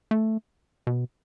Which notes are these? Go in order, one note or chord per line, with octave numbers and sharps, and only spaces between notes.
A3
B2